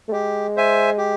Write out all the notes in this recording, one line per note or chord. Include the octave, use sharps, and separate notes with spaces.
A3
G#3 G4
C5 E5 G#5
G4